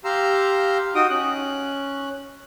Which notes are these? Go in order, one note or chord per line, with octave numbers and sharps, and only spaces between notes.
G4 F5 A#5 C6 E6
D#4 F#4 G5 D#6
C#4 F#6